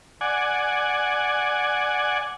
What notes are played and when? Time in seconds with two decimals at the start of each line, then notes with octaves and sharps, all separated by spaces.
0.21 D5 F#5 G#5